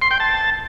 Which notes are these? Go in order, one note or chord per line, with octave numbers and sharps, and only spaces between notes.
C6
G5
A5